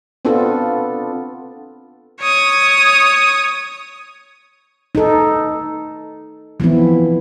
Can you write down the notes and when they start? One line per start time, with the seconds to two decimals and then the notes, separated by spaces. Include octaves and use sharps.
0.25 B3 C4 D4 F4 A4
2.22 C#5 D#6
4.95 D#4 A4
6.60 E3 F3 B3 C4 E4